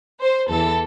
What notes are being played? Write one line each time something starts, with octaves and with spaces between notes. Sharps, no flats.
C5
E2 E3 A4